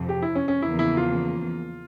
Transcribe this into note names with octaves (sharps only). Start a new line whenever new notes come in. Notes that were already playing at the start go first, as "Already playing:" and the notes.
Already playing: F2 C3 F3
G4
E4
C#4
C#4
E2 C#3 F3 A#3 E4
E4
F4